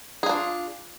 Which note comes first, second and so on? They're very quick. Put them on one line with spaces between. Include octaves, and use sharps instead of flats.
G#4 F4 D4